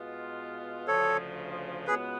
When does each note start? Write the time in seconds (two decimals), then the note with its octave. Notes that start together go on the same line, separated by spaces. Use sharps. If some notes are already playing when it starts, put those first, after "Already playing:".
Already playing: B2 G#3 B3 F4
0.87 D2 C#3 F3 A4 C#5
1.87 C#2 C#3 G#3 B3 F#4 G#4 B4